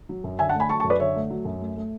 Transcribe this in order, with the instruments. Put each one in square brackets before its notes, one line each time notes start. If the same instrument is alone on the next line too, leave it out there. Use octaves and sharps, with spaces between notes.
[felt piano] F#3
F#2
D3 E5 G#5
F#5 A5
A3
G#5 B5
F#3 A5 C#6
A5 C#6
F#2
B4 D5
D3 C#5 E5
A3
F#3
F#2
A3
A3